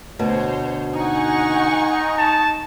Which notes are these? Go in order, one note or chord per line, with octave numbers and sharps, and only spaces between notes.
D2 B2 C5 C#5
D#4 F#5 G#5 C#6
A5